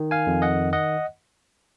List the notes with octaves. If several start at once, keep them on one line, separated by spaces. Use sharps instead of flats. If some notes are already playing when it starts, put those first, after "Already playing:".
Already playing: D#3
F5 G#5
F2
D#5 F#5
D#5 F#5